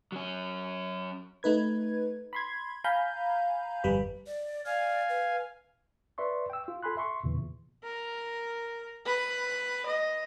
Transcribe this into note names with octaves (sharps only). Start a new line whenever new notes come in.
F#3 C#4
A3 D#4 B4 G#6
B5 C6 G#6
F5 G#5 A#5 B5 G6
G1 F2 G3 B4 B5
D5
D5 F5 G#5
B4
B4 D5 E5 C6 C#6
G5 E6
F4
A4 G#5 B5 C6 F#6
E5 C6 C#6
E2 A#2 C#3 E3
A#4
B4
D#5